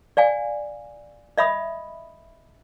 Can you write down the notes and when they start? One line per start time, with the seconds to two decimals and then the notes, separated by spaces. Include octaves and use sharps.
0.17 D5 F5 G#5
1.38 D#5 E5 B5 D#6